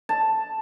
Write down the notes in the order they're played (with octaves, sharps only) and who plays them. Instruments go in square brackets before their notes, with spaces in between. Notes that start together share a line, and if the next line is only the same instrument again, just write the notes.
[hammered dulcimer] A5